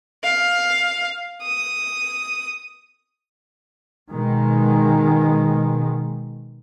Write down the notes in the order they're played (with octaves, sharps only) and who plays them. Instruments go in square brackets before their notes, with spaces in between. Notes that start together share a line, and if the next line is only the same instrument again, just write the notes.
[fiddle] F5
D#6
[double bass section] B2 D#3 G#3